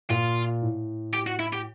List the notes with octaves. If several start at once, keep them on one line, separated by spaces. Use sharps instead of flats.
A#2 F4
A2
G4
F#4
E4
G4